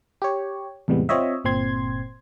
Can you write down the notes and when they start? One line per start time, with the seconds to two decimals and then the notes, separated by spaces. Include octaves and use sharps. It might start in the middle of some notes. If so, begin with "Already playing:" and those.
0.22 G4 C#5
0.88 E2 A2 C3 G3 G#3 B3
1.09 C4 F4 C#5 D#5 E5
1.44 G1 A#2 C4 C6 G#6